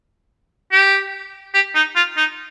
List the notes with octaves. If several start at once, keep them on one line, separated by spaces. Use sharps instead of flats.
G4
G4
D#4
F4
D#4